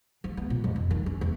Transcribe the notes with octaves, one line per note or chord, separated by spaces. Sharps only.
F3
B3
A#2
F2
F2
D#3
C#4
E2